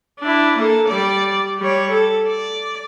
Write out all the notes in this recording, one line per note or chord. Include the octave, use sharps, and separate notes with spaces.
D4 E4
A#3 A4
G3 D5
G3 C#5
A4
D5